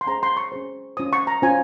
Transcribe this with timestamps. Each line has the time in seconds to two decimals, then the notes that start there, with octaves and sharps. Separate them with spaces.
0.01 C6
0.07 C#4 G#4 C5 A#5
0.23 C6
0.37 C#6
0.52 C#4 G#4 C5
0.97 C#4 F4 C5 D#6
1.13 C#6
1.27 A#5
1.42 C#4 F4 C5 G#5